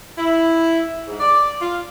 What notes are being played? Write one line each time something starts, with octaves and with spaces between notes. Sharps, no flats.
E4
G#2
D5
F4